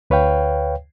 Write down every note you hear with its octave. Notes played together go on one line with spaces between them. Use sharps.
D2 B4 C#5 F5 G5